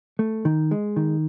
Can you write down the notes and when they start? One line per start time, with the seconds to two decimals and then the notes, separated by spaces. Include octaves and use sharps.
0.19 A3
0.45 D#3
0.71 G#3
0.96 D#3